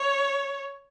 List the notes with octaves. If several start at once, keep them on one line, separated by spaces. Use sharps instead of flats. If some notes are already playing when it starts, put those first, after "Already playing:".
Already playing: C#5